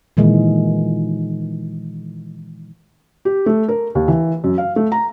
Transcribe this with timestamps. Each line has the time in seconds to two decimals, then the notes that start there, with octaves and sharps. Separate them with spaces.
0.17 A#2 D#3 E3 G#3
3.25 G4
3.46 A3
3.68 A#4
3.95 D#2
4.08 E3
4.44 F#2
4.58 F5
4.76 A3
4.92 A#5